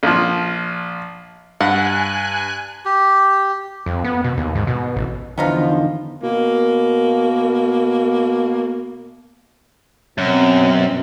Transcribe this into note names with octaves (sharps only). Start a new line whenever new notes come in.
A#1 F3
G2 F#5 G#5 F#6
G4
F2
B3
B2
D#2
G#2
B2
A1
E2 D3 D#3 F3 B3 D#4 F4
B2 A#3
F#2 B2 C4